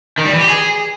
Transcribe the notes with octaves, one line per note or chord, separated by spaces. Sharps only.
D#3
G3
E3
G4
G#4